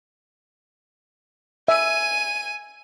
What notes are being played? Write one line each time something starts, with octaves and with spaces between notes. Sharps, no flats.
E5 G#5 D#7